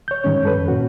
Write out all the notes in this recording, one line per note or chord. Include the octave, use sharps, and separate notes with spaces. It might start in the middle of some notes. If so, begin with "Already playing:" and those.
C#5 G6
G#2 D#3 G3 C#4 C#5
G2 A4 B4
F2
A#2 C#4 F#4